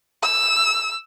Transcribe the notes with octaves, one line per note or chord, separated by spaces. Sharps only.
E6